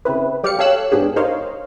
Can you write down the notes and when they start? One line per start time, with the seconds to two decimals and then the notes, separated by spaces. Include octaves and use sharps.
0.05 C#3 C4 E4 B4
0.43 G3 G4 D5 F5 C#7
0.59 G4 A4 C#5 F5 E6 F#6
0.92 G#2 B3 D4 G4 G#4
1.16 D#4 A#4 C5 C#5 D#5 F5